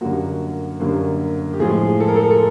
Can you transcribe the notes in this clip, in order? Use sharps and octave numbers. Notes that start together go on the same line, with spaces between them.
F#2 D3 G3 A#3 F#4
F#2 D3 G3 A#3
G4
A2 F3 G#3 G#4
A4
A#4
A4
A#4
A4